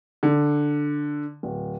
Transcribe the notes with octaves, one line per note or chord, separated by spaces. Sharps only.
D3
D1